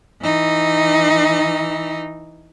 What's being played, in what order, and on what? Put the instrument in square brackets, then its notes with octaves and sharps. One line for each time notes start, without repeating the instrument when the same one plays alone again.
[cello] E3 D#4